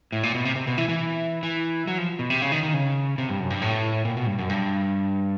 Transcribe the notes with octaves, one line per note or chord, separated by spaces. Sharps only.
A2
A#2
B2
C3
C3
B2
E3
E3
E3
F#3
F3
B2
C3
C#3
D#3
D#3
C#3
C3
G2
F#2
G2
A2
A#2
B2
G2
F#2
G2